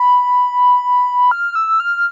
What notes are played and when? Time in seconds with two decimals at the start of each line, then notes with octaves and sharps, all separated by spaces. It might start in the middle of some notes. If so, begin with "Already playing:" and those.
Already playing: B5
1.31 F6
1.55 E6
1.80 F6